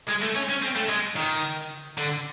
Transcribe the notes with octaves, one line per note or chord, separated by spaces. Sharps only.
G#3
A3
C#4
C#4
C4
A3
G#3
D#3
D3